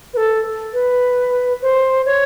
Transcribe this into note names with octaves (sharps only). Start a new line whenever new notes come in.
B4
A4
B4
C5
C#5